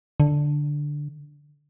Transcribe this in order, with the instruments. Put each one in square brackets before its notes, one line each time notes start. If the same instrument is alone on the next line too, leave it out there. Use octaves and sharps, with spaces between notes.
[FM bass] D3